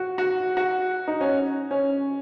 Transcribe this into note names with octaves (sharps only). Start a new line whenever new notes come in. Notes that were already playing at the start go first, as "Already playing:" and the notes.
Already playing: F#4
F#4
F#4
D#4
C#4
C#4